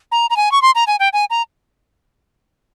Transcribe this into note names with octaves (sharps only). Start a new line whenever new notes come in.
A#5
A#5
G#5
C#6
C6
A#5
G#5
G5
G#5
A#5